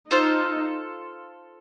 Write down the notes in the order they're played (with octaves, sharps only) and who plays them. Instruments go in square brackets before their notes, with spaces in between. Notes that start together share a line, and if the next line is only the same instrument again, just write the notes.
[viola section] D#4 [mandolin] F4 A4 C5 F5